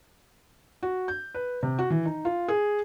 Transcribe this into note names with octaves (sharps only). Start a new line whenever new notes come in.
F#4
G6
B4
C3
F#4
E3
D#4
F4
G#4